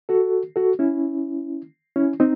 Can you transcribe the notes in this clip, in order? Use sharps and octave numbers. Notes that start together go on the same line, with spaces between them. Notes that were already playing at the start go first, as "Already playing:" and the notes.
F#4 A4
F#4 A4
C#4 E4
C#4 E4
C4 D#4